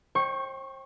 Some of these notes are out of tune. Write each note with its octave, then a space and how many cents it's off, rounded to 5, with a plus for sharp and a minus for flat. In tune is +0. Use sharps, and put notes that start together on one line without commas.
C5 +40 G5 +5 C#6 -15